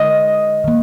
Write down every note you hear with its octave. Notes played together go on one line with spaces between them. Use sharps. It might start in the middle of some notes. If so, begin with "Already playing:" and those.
Already playing: D3 G#3 D#5
D#3 A#3